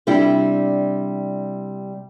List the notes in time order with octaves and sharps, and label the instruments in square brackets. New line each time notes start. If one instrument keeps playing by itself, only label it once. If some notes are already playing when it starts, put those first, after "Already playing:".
[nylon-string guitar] C3 G3 D4 E4 G4